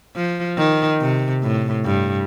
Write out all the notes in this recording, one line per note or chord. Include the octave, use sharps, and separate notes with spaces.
F3
D#3
C3
A2
G2